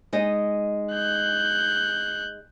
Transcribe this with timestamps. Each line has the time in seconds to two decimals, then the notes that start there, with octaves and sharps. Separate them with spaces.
0.13 G#3 D#4 D#5
0.93 F#6 G6